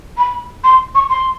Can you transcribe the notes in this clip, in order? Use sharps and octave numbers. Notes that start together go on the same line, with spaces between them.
B5
C6
C#6
C6